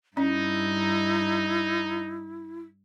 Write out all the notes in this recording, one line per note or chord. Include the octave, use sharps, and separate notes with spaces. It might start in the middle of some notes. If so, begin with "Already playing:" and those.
G2 C#4 D#4 E4